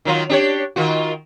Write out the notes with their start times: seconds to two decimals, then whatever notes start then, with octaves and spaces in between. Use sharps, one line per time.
0.05 D#3 F#3 F4
0.29 D4 G4 C#5
0.76 D#3 F4 F#4